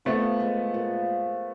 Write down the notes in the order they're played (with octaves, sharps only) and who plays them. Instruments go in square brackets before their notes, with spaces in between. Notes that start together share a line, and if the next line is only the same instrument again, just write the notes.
[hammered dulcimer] F3 [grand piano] A3 B3
[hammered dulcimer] G#3
A#2